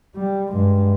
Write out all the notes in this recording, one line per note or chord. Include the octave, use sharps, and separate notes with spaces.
G3
G2 G#3